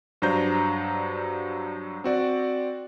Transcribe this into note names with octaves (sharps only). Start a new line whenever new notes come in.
G2 F#3 D4 C5 A#5 G6
C4 F#4 D5